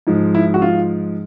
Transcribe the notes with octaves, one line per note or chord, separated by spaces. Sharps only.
G#2 F3 G#3
E4
F#4
F4